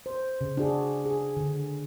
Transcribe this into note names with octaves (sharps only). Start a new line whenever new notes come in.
C5
C#3
D4 F#4 G#4
G#4
D3